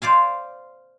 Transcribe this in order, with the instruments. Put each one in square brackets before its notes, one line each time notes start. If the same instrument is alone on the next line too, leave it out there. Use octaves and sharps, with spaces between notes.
[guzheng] C5 D5 F5 G#5